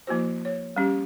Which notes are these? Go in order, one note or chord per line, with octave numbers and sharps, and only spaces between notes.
F3 A#3 E4 F#4 C5
C#5
G3 C#4 G4